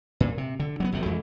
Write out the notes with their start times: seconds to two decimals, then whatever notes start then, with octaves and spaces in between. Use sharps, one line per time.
0.20 A#2
0.38 C3
0.60 D3
0.80 F#3 A#3 B3
0.92 G1 C3 F3 F#3
1.05 F2 E3 G#3